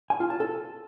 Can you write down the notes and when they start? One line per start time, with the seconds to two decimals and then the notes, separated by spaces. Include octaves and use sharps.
0.10 G#5
0.20 F4
0.30 A5
0.40 A4